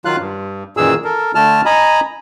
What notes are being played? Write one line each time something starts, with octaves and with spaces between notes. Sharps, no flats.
D#3 F#3 F4 F5 F#6
G2
F#2 A#2 D#3 E3 G#4 E6
A4 A#4
D3 A3 A5 F6
D#5 G#5 A#5 B5